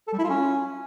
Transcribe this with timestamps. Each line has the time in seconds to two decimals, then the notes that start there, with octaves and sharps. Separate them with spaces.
0.07 A4
0.13 G3
0.19 E4
0.24 F4
0.30 C#4